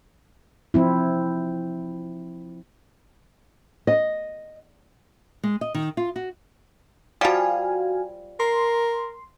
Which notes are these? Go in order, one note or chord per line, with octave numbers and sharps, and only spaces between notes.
F3 C4 E4
D#5
G#3
D#5
D#3
F4
F#4
F3 G3 F#4 F5 G#5
A#4 C6